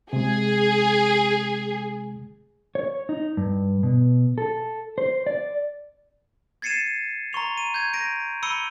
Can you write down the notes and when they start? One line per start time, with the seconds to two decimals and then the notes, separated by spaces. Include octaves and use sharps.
0.13 C3 G#3 G#4
2.75 C#5
3.09 D#4
3.37 G2
3.83 B2
4.38 A4
4.98 C5
5.27 D5
6.62 G#6 A6 C7 C#7 D#7 E7
7.33 A#5 C6 C#6 F7
7.58 D#7
7.74 G6 G#6
7.93 A#6 D7 D#7
8.43 B5 E6 C#7 D#7 G7